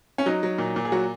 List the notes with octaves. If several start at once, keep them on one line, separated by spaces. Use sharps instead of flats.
C#4
F#3 D#4
F#3
A#2
A#2
G#4
F#3 F#4